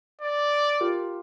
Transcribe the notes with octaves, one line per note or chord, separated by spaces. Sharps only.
D5
F4 G4 A#4